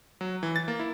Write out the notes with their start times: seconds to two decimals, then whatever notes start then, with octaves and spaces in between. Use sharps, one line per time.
0.21 F#3
0.43 E3
0.56 A6
0.68 A#3
0.79 E4